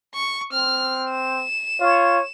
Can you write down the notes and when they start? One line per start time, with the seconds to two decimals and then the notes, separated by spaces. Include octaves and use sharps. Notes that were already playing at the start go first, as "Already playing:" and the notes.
0.15 C#6
0.53 C4 F6
1.11 E7
1.81 F4 C#5